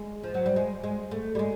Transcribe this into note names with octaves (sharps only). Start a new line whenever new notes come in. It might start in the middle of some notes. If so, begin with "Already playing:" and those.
Already playing: G#3
F3
F#3
G3
G#3
G#3
A3
G3
G#3